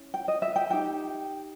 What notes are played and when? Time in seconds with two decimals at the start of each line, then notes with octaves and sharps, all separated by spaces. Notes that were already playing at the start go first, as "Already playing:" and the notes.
Already playing: C#4 E4
0.14 G5
0.28 D#5
0.42 E5
0.56 G5
0.70 D#4 G4 A#4 G5